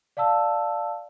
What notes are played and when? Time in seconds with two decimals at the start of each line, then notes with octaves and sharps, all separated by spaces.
0.17 D5 F5 A5 E6